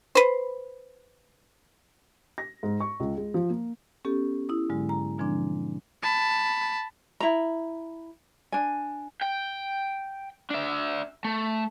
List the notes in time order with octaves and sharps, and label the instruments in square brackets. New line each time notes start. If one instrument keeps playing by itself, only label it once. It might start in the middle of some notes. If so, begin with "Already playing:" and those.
[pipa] B4 C5
[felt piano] A#6
G#2
C#6
C#2
G#3
F3
A#3
[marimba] B3 C#4 G4 A4
E4 D#6
G#2 D3 F#3 G#3
A#5
B2 D3 F3 G#3 C4 D4
[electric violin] A5 B5
[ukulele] E4 A#5
D4 G#5
[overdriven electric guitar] G5
D4 E5
A3